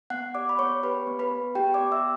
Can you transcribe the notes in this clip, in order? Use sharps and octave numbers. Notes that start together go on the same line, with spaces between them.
B3 F#5 F#6
G4 D5 D6
B5
B3 C#5 C#6
G4 B4 B5
B3
B4 B5
B3
B3 G4 G5
D5 D6
B3
E5 E6